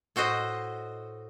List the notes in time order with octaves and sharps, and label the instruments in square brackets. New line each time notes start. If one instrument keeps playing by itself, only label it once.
[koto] A2 F#4 C5 D#5